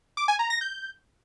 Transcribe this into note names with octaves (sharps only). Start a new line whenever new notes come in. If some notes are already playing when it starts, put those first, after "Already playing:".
D6
G#5
A#5
A#6
G6